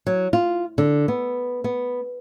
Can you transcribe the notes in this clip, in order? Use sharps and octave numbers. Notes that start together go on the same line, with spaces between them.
F#3
F4
D3
B3
B3